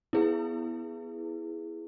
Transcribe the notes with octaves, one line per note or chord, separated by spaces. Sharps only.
B3 E4 G#4 B4